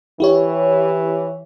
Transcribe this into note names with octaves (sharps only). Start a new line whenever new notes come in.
E3 E4 G4 C#5